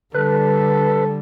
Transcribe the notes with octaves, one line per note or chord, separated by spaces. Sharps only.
D3 G3 A4 B4